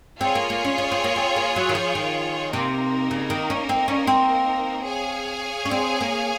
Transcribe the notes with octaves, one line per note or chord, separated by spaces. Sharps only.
C4 F4 G#4 C#5 G#5
A#3
A#3
C#4
C#4
C4
A#3
C4
A#3
F#3
D#3
F3
D#3
C3 A#3 D#4 A#4
C#3
D#3
C#4
C4
C#4
C4
G#4 C#5 F5 G#5
C#4
C4
A#3